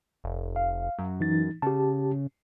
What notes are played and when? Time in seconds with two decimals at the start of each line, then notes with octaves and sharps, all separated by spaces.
0.24 F1
0.56 F5
0.99 F#2
1.20 E3 D#4 A6
1.62 C#3 G4 A5